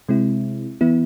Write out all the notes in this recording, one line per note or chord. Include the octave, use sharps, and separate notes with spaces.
C3 G#3 C4 E4
E3 B3 E4